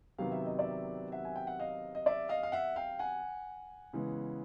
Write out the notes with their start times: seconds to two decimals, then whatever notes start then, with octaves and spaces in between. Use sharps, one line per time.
0.18 C3 D#3 F#3 B3 F5
0.32 E5
0.46 D#5
0.59 D5 E5
1.12 E5 F#5
1.25 G#5
1.36 G5
1.47 F#5
1.59 D#5 F5
1.95 D#5
2.06 D5 E5
2.29 D#5 F5
2.43 F5
2.52 E5 F#5
2.76 F5 G5
2.99 F#5 G#5
3.93 C#3 E3 G#3 B3